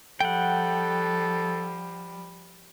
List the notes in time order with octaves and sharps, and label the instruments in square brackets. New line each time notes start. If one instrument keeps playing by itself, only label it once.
[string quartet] F3 G3 [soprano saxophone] A4 [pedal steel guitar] F#5 G5